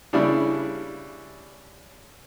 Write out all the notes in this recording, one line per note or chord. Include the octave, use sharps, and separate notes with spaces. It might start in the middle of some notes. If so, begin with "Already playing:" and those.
C#3 G3 D4 E4